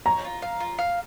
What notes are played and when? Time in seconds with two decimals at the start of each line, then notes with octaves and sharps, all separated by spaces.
0.05 C#5 A#5
0.24 F4
0.42 F5
0.60 F4
0.78 F5